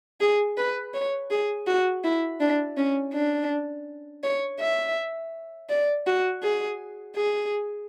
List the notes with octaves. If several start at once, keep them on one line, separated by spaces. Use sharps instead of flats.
G#4
B4
C#5
G#4
F#4
E4
D4
C#4
D4
C#5
E5
D5
F#4
G#4
G#4